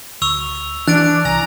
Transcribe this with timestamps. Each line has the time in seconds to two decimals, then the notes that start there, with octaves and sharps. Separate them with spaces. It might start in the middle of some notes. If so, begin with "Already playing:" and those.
0.22 D2 C#6 E6 F7
0.88 E3 D4 F#6 A6 D7
1.25 C2 G#5 A#5